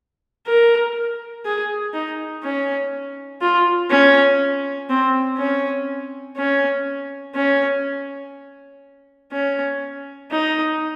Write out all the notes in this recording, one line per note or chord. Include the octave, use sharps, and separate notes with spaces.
A#4
G#4
D#4
C#4
F4
C#4
C4
C#4
C#4
C#4
C#4
D#4